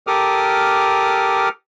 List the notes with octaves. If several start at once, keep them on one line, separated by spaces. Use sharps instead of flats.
G4 A4 A#4 D6 D#6 F6